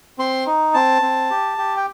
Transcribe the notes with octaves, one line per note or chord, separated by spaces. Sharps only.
C4 C6
D#4
C4 A5
C4
G4
G4
G5